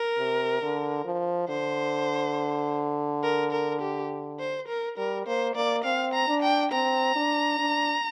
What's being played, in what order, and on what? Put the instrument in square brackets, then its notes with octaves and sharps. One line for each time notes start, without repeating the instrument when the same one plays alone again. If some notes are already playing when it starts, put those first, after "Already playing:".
Already playing: [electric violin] A#4
[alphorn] C3
D3
F3
[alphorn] D3 [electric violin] C5
[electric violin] A#4
A#4
G4
C5
A#4
[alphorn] G3 [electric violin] A#4
[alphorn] A#3 [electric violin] C5
[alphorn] A#3 [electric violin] D5
[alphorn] C4 [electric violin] F5
[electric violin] A#5
[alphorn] D4
[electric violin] G5
[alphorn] C4 [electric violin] A#5
[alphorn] D4
D4